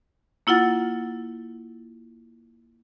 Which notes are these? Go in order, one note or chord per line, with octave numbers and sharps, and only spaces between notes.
A#3 E4 F4 F#5 A6